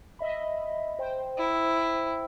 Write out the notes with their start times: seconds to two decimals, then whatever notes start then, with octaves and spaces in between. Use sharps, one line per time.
0.19 D#5 E5 B5
0.99 C5 G5
1.38 E4